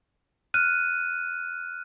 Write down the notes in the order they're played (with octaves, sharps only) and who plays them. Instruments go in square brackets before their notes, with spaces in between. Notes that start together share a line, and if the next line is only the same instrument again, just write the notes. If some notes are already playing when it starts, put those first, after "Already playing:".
[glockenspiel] F6 F#6 D#7